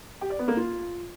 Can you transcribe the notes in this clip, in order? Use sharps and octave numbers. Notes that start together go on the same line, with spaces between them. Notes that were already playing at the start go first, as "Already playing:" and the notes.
G4
D5
B3
A#3
F4